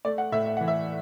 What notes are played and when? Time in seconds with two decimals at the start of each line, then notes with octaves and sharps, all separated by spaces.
0.05 A3 D5
0.18 F#5
0.32 A2 E5
0.46 E5
0.57 E3 F#5
0.68 E5